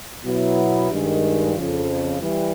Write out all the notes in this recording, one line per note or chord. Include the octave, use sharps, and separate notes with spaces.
B2 F#3 B3 E4
G2 D#3 G#3
F2 C#3 F3
E3 G3